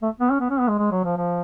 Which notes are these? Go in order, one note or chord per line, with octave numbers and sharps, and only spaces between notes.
A3
B3
C#4
B3
C#4
B3
G#3
G#3
F#3
F3
F3